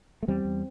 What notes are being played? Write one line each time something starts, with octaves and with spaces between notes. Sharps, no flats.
A3
E2 G3 C4
E2